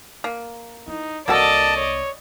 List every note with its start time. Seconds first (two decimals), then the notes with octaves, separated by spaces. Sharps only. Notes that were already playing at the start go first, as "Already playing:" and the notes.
0.24 A#3
0.88 D#4 E4
1.28 C2 A#3 F#4 A4 D5 D#5 A5
1.76 C#5